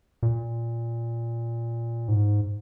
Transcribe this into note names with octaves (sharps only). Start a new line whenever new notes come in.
A#2
G#2